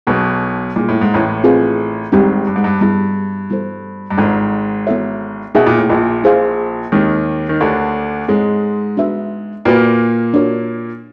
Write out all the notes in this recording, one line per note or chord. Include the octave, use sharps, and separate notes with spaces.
B1 B2 B3 D#4 G#4 B4
A#2 G3 A#3 D#4 G#4
A2
G#2
A1 A2
C4 F4 G#4 B4
G#1 G#2 G3 C4 D#4 G4
G2
G#2
G2
G2 G3 B3 E4 G#4
G3 B3 E4 A4 C5
G2
G#1 G#2 D4 F4 A4 D5 G5
B3 E4 A4 C#5 E5
B2 D#4 G#4 B4 E5 G5
A#2
A2
A#1 A#2
E4 G#4 C5 F5
D#2 D#3 G#3 C4 E4 G4
D#3
D2 D3 E4 G4 A#4 C#5
G#2 G#3 C4 E4 A4 C#5
B3 D4 F#4 B4 E5
A#2 A#3 F#4 B4 D5 G5
D4 F#4 A#4 C#5